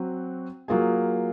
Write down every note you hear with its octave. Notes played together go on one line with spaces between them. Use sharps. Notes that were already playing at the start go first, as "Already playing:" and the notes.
Already playing: F#3 C4 F#4
F#3 A#3 F4 G#4